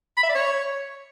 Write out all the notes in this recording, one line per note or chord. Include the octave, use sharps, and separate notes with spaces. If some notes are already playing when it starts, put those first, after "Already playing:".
B5
E5
D5
C#5